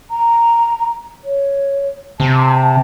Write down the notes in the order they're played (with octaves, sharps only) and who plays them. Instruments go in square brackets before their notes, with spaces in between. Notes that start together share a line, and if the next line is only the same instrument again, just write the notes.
[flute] A#5
C#5
[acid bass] C3 [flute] A5